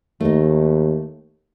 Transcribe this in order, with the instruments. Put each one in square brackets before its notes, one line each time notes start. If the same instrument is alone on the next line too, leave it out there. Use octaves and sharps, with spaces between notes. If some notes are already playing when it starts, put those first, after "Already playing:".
[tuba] D#2 [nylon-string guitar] A3 D#4